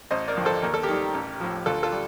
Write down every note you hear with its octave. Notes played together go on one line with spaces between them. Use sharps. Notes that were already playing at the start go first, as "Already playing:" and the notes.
A1 C5 D#5
A#4 D5
G2 D3 F3
A4 C5
D#2 A#4
A4
G4 A#4
D#3 G3
A1
A2 F3
D2 F4 A4
F4 A4
G3